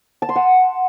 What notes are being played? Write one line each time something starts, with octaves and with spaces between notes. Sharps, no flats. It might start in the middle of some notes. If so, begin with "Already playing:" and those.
A5
C6
F#5